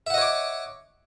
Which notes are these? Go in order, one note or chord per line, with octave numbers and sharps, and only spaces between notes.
C#5 D#5 E5 F#5 D6